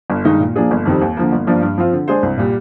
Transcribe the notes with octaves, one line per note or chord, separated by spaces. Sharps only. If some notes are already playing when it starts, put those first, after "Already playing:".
G1
G2 D#3 G#3 D#4
A#2
F3 A#3 D4 G#4
G1
F2 D#3 G3 C4
D#2
D3 F3 A#3
G1
G2 F3 A#3 D4
G2
F3 C4 F4
D3
G#3 D4 G#4 C5
C2
A#2 G3